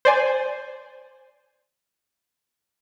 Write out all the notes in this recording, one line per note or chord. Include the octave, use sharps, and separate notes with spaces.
C5 D5 G#5